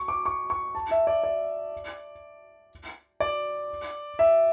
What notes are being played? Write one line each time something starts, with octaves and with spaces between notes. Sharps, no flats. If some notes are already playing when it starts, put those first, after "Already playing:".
Already playing: C#6
D6
C#6
C#6
A5
E5
D5
D5
D5
E5